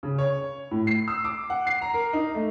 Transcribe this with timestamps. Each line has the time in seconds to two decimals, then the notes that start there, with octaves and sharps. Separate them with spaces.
0.03 C#3
0.18 C#5
0.71 A2
0.87 C7
1.08 E6
1.24 D6
1.50 F#5
1.67 C7
1.82 A#5
1.94 A#4
2.13 D#4
2.35 A3